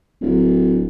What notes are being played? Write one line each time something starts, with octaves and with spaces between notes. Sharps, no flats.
D1